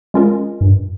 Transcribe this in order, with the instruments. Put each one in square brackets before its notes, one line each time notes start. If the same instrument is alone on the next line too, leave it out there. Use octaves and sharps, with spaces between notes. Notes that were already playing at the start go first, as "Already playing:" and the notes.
[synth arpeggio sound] G#3 C#4 F4 A#4 D#5
[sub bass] G2